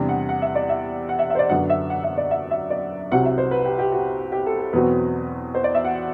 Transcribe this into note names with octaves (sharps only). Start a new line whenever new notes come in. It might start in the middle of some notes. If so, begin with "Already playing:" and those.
Already playing: E2 C3 G3 D4
F#5
F#5
E5
D5
E5
F#5
E5
E5
C5
D5
F#2 D3 F#3 B3 D4 F#5
E5
F#5
E5
D5
E5
E5
D5
C2 C3 F#3 C4 F#5
E5
C5
B4
G4
G4
F#4
G4
A4
A4
E2 B2 F#3 C4 B4
C5
D5
E5
F#5